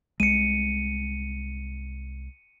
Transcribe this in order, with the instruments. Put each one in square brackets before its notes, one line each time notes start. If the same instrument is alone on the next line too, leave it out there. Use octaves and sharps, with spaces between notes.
[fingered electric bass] C2 G#3 [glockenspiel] C#7 D#7